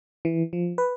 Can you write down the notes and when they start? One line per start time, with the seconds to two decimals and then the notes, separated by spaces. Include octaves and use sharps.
0.25 E3
0.53 F3
0.78 B4